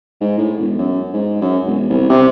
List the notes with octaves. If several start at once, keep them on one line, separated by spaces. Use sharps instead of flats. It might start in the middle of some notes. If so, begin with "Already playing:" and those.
G#2
A2
E1
F#2
G#2
F#2
E1
C2
C3